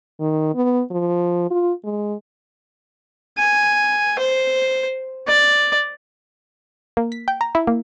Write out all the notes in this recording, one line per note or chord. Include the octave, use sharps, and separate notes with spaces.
D#3
B3
F3
F4
G#3
G#5
C5
D5
A#3
B6
G5
A#5
E4
A#3